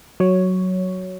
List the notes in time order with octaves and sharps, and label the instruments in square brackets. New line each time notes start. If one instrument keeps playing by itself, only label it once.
[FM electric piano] F#3 C#5